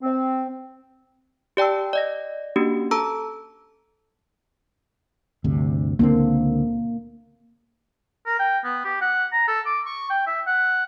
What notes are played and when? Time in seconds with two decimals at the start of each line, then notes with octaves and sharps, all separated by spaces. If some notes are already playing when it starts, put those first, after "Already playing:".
0.02 C4
1.57 G4 D5 G5 A5 E6
1.93 D5 D#5 A#6
2.56 A#3 C#4 D4 F#4 G4
2.91 A4 A5 A#5 E6
5.44 G1 D2 C3
5.99 C#2 D3 A#3 C4
8.26 A#4
8.39 G5
8.64 B3
8.85 G4
9.01 F#5
9.32 A#5
9.48 A4
9.66 D6
9.85 C#6
10.10 G5
10.27 E5
10.47 F#5